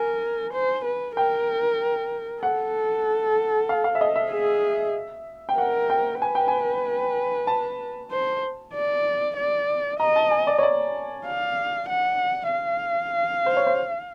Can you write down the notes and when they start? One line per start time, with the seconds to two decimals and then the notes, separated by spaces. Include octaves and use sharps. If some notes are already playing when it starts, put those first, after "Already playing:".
Already playing: A#4 G#5
0.53 C5
0.85 B4
1.16 A#4 G5
2.42 A4 F#5
3.69 F5
3.84 F5
3.95 E5
4.01 D#5
4.16 E5
4.31 G#4
5.49 G5
5.58 A#4 F#5
5.90 G5
6.22 B4 G#5
6.35 G5
6.48 G#5
7.47 A5
8.11 C5
8.74 D5
9.36 D5
10.00 D#5 A#5
10.16 A5
10.31 G#5
10.47 D5
10.58 C#5
10.63 D5
11.27 F5
11.89 F#5
12.52 F5
13.46 C5
13.57 C#5
13.67 C5